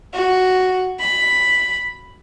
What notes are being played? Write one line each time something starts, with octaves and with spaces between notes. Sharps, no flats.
F#4
B5